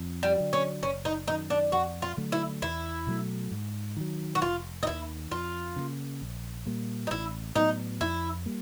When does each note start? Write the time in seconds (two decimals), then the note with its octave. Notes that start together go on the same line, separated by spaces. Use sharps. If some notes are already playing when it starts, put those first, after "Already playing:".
Already playing: F2
0.23 G3
0.38 D3 F#3
0.53 C#4
0.83 F#1 C#4
1.05 D#4
1.27 F#2 D#3 D#4
1.50 D4
1.72 F2 F#4
2.02 F4
2.17 D3 F#3 A3
2.32 E4
2.62 E2 E4
3.07 B2 F#3 A3
3.51 G#2
3.97 D#3 F#3
4.35 F#4
4.42 F1 F4
4.83 D#4
4.87 D#2 D#3 E4
5.31 F2 F4
5.76 C#3 F3 A#3
6.21 A#1
6.66 A#2 G3 A#3
7.07 D#4
7.11 A1 E4
7.55 A2 F#3 B3 D#4
8.01 F2 E4
8.46 G3 A#3